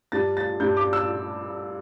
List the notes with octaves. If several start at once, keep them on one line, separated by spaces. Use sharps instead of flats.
G2 G3 D4 A6
A6
G2 G3 D4 G6
D6
E6